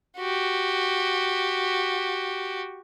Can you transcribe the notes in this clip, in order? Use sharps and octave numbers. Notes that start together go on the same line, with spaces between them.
F#4 G4